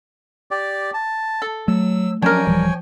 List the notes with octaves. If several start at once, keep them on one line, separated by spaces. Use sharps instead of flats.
G4 D5
A5
A4
F#3 A3 E6
F3 F#3 C#4 D4 A#4 C#5 G5 G#5
D#1 E3 F3 G3